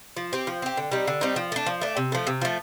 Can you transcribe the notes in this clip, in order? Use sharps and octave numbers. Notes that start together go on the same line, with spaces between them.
F3
C4 G4
F3
C4 G4
D3
G3 C4 D#4
D3
G3 C4 D#4
F3
A3 D4
F3
A3 D4
C3
F3 A3
C3
F3 A3